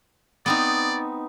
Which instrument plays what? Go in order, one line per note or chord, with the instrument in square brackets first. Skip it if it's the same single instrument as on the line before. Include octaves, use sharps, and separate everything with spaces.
[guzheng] B3 C4 D#4 [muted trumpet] D5